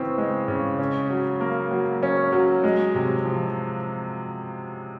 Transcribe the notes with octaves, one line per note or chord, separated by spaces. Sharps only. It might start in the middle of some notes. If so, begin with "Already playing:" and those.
Already playing: C#3 E3 C4
G#3
C#3
C#4
F#3
A#3
F#3
C#4
F#3
G#3
C3
F3